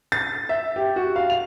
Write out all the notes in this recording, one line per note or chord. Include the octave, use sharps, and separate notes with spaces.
A6
E5
G4
F#4
F5
F7